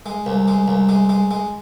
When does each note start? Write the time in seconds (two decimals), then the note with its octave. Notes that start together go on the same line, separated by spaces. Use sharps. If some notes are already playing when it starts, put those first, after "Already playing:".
0.06 G#3
0.26 C2
0.48 G#3
0.68 C2
0.89 G#3
1.09 G#3
1.31 G#3